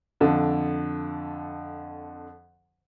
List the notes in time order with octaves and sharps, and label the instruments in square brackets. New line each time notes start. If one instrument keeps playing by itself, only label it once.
[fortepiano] F2 D3